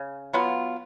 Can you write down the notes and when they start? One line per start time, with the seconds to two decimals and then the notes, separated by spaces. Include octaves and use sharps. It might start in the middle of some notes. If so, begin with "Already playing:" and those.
Already playing: C#3
0.33 F#3 B3 F4